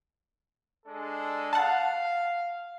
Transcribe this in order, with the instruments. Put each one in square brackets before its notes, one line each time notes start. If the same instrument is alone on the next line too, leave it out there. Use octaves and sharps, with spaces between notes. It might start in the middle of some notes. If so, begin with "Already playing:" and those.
[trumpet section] G#3 D4 A4
[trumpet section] F5 [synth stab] F#5 A5